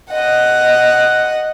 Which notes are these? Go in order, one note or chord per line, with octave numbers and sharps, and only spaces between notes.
D#5 F#5